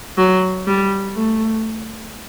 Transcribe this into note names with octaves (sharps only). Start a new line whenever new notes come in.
F#3
G3
A3